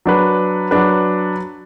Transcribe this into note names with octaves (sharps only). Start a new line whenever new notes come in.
F#3 D4 B4
F#3 D4 B4